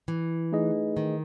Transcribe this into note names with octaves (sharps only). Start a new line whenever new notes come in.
E3
A3 D#4 G#4 B4 D#5
D#3